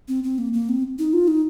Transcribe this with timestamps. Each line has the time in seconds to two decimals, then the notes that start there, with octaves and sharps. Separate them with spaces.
0.08 C4
0.24 C4
0.38 A#3
0.53 A#3
0.69 C4
0.99 D#4
1.13 F4
1.28 D#4